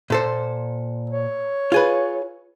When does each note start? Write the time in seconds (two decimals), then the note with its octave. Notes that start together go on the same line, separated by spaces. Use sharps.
0.10 A#2 A4 C5
1.10 C#5
1.72 F4 G#4 B4